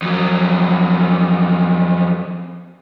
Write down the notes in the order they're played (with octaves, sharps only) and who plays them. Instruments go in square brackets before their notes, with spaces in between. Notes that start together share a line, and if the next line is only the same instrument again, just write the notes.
[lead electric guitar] F2 F#3